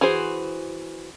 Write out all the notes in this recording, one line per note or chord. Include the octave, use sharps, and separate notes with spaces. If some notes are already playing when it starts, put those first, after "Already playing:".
E3 F#4 G#4 C5